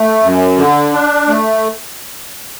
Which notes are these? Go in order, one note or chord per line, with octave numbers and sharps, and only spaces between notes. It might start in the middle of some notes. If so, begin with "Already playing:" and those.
Already playing: A3
F#2
D3
D4
A3